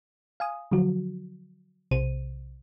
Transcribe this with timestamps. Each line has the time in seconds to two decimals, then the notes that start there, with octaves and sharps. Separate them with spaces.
0.40 F5 G#5 D#6
0.71 D3 F3 F#3 F#4
1.91 B1 C3 C5 D#7